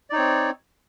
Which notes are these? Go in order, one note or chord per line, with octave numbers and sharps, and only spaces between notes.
C4 D#4 C#5 D5